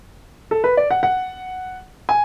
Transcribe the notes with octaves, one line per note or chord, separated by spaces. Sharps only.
A4
B4
D5
F#5
F#5
G#5